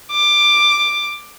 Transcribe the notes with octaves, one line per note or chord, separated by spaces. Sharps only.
D6